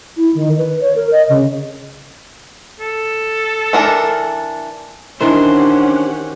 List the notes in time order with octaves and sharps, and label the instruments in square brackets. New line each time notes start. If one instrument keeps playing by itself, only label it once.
[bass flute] E4
D#3
B4
C#5
A#4
D#5
C#3
[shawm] A4
[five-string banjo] E3 D4 A#4
[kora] D#3 E3 [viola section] C#4 G4 F#5 [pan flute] D4 [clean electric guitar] C5